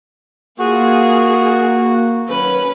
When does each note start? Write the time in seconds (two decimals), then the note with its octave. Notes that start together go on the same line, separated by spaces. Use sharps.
0.59 A#3 F4 F#4 G#4
2.28 D#3 F#3 C#4 B4